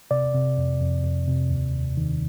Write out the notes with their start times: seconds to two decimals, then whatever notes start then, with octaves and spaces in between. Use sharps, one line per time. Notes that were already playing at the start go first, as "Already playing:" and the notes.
0.11 C3 D5
0.34 C3
0.58 F2
0.81 F2
1.04 F2
1.28 C3
1.50 D#2
1.74 D#2
1.97 D#3